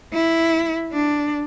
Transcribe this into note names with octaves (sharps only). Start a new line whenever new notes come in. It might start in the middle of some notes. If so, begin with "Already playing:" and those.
E4
D4